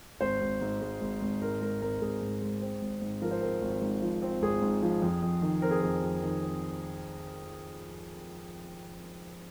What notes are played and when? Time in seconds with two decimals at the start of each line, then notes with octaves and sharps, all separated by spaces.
0.21 G#1 C5
0.41 G#1
0.61 G#2
0.82 G#3
1.01 G#1
1.21 G#1
1.42 G#2 A#4
1.62 G#3 A#4
1.82 G#1 A#4
2.02 G#1 G#4
2.22 G#2
2.42 G#3
2.62 C4
2.82 G#1
3.02 G#2
3.22 F3 A#4
3.31 C5
3.42 C4 A#4
3.62 G#1
3.82 G#2
4.02 F3
4.22 C4
4.42 G#1 G#4
4.62 G#2
4.82 F3
5.02 F2
5.22 F2
5.42 D#3
5.62 C4 A#4
5.71 G#4
5.80 F2 A#4
6.02 F2
6.22 D#3
6.43 C4